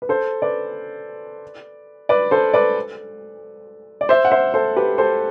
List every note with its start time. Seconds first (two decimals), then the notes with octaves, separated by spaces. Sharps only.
0.02 B4
0.09 A4 C5
0.42 B4 D5
2.09 B4 D5
2.31 A4 C5
2.54 B4 D5
4.01 D5
4.09 C5 E5
4.25 F#5
4.32 C5 E5
4.54 A4 C5
4.76 G4 B4
4.98 A4 C5